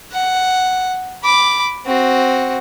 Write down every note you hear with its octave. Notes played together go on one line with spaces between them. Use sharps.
F#5
B5 D6
C4 F#4